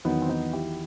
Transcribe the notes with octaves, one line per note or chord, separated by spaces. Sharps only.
E2 D#3 F#3 B3 D#4
C4
B3 D#4
E4 G4